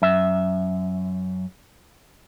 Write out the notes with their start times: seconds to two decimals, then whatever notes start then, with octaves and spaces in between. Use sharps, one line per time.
0.02 F#2 E5